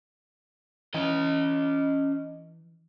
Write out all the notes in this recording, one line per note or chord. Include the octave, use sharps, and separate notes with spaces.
E3 C#4 D#5